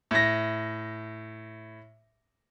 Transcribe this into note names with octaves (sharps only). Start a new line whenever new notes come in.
A2 A#6